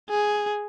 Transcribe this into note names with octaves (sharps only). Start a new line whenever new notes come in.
G#4